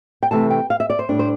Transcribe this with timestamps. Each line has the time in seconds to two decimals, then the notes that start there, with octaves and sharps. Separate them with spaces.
0.23 G5
0.31 C3 E3 A3 A5
0.50 G5
0.70 F5
0.80 E5
0.90 D5
0.99 C5
1.09 A2 G3 D4
1.19 C5